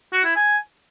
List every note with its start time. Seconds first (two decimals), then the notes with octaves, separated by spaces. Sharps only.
0.13 F#4
0.24 E4
0.36 G#5